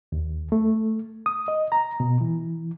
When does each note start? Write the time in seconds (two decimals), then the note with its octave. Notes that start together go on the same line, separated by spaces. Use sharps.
0.12 D#2
0.52 A3
1.26 D#6
1.48 D#5
1.72 A#5
2.00 B2
2.21 E3